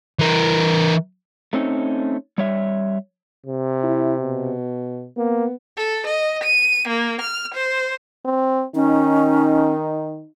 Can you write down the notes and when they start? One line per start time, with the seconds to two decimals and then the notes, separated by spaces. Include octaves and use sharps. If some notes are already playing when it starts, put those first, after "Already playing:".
0.19 E3 A#4
1.53 A3 C4 C#4 D#4
2.38 G3 C#5 E5
3.46 C3
3.83 E4
4.21 B2
5.17 A#3 B3
5.77 A4
6.06 D#5
6.43 D#7
6.88 A#3
7.21 F6
7.54 C5
8.25 C4
8.75 D#3 C#4 D#4